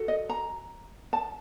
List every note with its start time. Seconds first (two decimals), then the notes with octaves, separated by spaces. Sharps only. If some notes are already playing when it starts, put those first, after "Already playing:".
Already playing: F#4 A4
0.08 D#5
0.29 A#5
1.13 A5